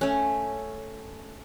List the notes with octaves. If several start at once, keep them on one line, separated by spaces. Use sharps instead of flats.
A3 C#4